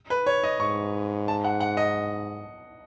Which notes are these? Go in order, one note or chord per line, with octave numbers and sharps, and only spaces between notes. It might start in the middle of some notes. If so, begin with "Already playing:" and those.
B4
C#5
D#5
G#2 C#6
A5
F#5
F#5
D#5